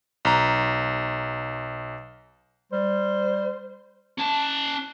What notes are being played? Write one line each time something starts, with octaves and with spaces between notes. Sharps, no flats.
B1 A#5
G3 C5
C#4 A5